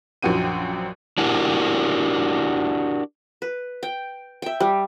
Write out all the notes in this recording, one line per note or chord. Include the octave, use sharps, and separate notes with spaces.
A#1 F#2 F3 F#4 G5 D#7
D4 E4 F#4 G4 A#4
B4
G5
E5 G5
G3